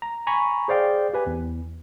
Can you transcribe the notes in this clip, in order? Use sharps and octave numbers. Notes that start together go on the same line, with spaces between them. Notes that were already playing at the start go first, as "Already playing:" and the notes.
A#5
G#5 A#5 B5 C#6
G#4 C5 D5 F5 G5
G4 B4 G#5
E2